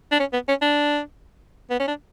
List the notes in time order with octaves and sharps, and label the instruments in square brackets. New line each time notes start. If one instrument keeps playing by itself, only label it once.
[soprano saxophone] D4
C#4
B3
C#4
D4
B3
C#4
D4